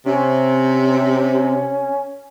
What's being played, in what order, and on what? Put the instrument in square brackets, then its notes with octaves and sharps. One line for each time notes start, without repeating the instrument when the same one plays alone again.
[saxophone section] C3 [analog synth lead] C#4